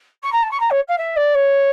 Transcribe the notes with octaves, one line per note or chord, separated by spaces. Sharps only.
C#6
A#5
A5
C#6
A#5
C#5
F5
E5
D5
C#5